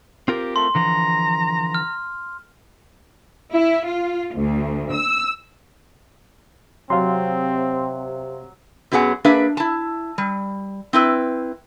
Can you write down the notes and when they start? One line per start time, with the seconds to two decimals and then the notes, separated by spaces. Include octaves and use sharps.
0.28 C4 F4 G4 A#4
0.56 A3 C6
0.75 D3 E3 F3 A#5
1.75 F6
3.52 E4
3.87 F4
4.35 D2
4.92 E6
6.90 C3 F#3 C4 F5 C6
8.92 F#2 F#3 B3 G#4 F#5
9.24 A#3 D4 G#4 B4 E5
9.57 E4 A5
10.18 G3
10.93 C4 E4 B4